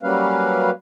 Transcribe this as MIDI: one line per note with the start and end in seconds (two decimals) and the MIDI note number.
0.03 0.71 54
0.03 0.71 55
0.03 0.71 58
0.03 0.71 61
0.03 0.71 71
0.03 0.71 77